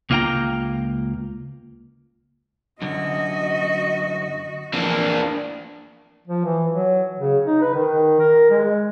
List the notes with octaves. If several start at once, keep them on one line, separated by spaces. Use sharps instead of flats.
C#2 A#3 F4 E5 G5 A#5
F#2 D3 F#4 D#5
F2 E3 A#3 D4
F3
E3
F#3
C#3
D#4
B4
D#3
A#4
G#3